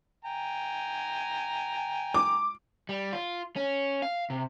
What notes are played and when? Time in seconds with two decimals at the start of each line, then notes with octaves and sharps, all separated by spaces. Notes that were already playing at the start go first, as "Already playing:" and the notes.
0.25 G5 G#5 A#5
2.14 D6
2.89 G3
3.13 F4
3.56 C#4
4.02 F5
4.30 C3